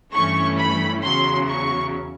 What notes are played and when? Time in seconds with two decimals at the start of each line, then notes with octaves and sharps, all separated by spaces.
0.13 G2 E3 A3 C#4 C#6
0.58 B5
1.03 E2 C#3 F#3 C6
1.49 C#6